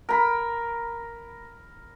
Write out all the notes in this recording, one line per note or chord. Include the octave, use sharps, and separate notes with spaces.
A#4 B5